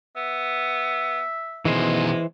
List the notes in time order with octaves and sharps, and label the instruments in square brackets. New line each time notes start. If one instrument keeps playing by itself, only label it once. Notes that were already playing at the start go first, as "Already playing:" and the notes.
[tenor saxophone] B3 [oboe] E5
[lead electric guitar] B2 D#3 [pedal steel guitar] E3 C5 [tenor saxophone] G#3